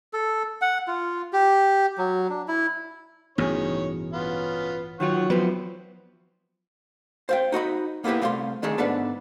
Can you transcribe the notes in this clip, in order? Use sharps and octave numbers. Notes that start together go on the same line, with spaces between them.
A4
F#5
F4
G4
F#3
D4
E4
A1 G2 B2 D#3 G#4 C#5
B3 C#4 F4
D#3 F#3 F4 C#5 F#5 C#6
F3 F#3 B3 C4 B4
C5 F5 G5
D#4 F#4 D#5 B5
A#3 B3 E4 G4 B4
C2 A3 F5 G5 C6
D3 D#3 A3 G#4 A4
G#2 B3 D4 A4 B4 A5